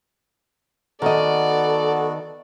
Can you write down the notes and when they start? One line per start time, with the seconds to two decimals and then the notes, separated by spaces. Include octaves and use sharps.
1.02 D#3 B3 F#4 A4 D5 D#5